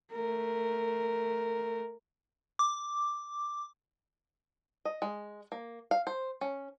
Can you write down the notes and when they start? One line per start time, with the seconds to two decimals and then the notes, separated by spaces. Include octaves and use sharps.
0.12 A3 A#4
2.59 D6
4.85 D#5
5.02 G#3
5.52 A#3
5.91 F5
6.07 C5
6.41 C#4